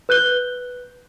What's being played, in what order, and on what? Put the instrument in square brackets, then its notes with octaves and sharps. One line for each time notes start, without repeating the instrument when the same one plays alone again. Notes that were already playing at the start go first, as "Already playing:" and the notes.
[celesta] B4 F#6 G6 G7